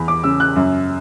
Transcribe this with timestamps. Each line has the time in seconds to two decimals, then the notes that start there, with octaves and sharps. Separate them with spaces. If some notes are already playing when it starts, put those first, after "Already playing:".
Already playing: E2 B5
0.08 D6
0.24 C#3 E6
0.40 F#6
0.56 F#2